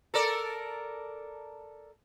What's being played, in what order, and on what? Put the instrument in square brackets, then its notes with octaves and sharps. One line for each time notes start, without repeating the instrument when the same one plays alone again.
[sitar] A4 A#4 D5